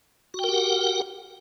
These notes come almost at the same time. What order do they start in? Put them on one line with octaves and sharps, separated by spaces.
F#4 G5 A#4 G4 F#5